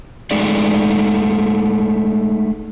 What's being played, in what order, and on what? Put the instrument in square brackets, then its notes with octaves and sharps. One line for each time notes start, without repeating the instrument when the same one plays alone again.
[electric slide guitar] G#3 A3 D#4 G#4 D5